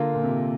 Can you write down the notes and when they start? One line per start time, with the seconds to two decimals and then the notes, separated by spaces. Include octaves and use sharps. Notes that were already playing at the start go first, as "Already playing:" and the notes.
Already playing: D3 A#3 F4 A#4
0.14 A#2
0.23 C3